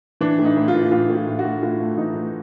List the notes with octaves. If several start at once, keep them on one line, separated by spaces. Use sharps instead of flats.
E3 D4
A2
D#4
A2
F4
E3
A2 F4
A2
F4
A2
F#4
A2
A2 F4
A3
E3 D#4
A3